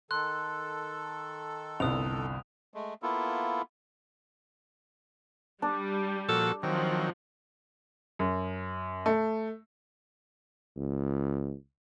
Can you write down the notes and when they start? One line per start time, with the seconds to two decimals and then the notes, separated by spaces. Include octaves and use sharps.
0.11 D#3 A4 C6 F#6
1.80 G1 C2 D#6 F7
2.74 G#3 A3
3.03 A#3 B3 E4 F4 A4
5.62 G3 D4
6.29 A#2 F3 F#4 A4
6.63 D#3 F3 F#3 C4
8.19 F#2
9.06 A3
10.76 C#2